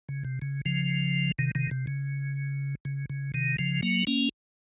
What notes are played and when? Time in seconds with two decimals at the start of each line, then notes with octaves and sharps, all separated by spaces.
0.09 C#3
0.25 C3
0.42 C#3
0.65 C#3 F3
1.38 C3 D#3
1.55 C3 D#3
1.71 C3
1.87 C#3
2.85 C#3
3.10 C#3
3.34 C3 D#3
3.59 C#3 F3
3.82 F#3 A#3
4.07 A#3 C#4